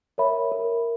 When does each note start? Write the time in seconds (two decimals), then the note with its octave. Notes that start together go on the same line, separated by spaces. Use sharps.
0.18 A#4 C#5 E5 B5
0.52 A#4